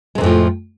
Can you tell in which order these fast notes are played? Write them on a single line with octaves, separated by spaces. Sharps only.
G#3 C3 F2 A2 F3